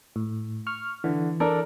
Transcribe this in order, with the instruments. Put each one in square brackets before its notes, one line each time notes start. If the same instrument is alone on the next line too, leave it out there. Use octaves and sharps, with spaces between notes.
[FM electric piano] A2
C#6 F6
[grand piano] D3 [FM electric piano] E3
[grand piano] D4 A4 A#4